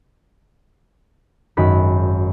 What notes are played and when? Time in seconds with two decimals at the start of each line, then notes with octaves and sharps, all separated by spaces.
1.57 G#1 F#2 D#4 F#4 B5 F#6